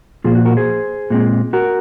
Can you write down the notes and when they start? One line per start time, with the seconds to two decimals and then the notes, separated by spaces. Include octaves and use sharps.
0.24 A#2 F3 A#3 F4 G#4
0.35 F#4
0.45 F#4 A#4
0.57 G#4 C5
1.10 A#2 G#3 C4
1.53 F#4 A#4